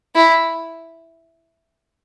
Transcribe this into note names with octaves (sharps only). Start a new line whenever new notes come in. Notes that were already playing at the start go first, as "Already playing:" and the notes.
E4